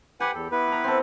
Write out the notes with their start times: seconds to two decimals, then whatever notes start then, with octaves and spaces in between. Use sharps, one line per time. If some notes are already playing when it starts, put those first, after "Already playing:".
0.20 G4 B4 F#5 G#5 B5
0.34 E2 A4
0.52 B3 E4 B4
0.68 A#5 B5
0.84 C4 A4